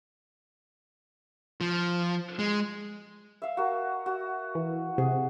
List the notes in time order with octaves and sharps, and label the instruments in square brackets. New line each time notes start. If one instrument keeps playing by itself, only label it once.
[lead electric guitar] F3
G#3
[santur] E5 F5
F#4 A#4
F#4
[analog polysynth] E3
[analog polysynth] C3 [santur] G#4